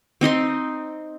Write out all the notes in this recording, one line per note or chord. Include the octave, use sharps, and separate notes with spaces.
C4 D#4 D#5 C6